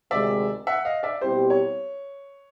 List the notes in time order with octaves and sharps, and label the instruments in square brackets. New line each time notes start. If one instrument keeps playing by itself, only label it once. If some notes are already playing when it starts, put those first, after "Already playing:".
[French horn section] D2 C3 D#3 G#3 [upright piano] D5 E5
[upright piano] E5 F#5
D#5 F5
D5 E5
[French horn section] B2 G3 C4 E4 G4 [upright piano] C5
[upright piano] C#5